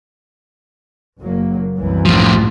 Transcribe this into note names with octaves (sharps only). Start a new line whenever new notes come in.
F#1 F#3 A#3
C2 F#2 E3
A2 F3